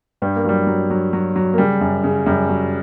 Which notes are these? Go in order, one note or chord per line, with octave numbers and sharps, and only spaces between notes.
G2 G3
A#3
F#3 G3
F#3
F#3
F#3
F#3
A#3
C#3 G3
F#2
C#3
F#2 G3
F#3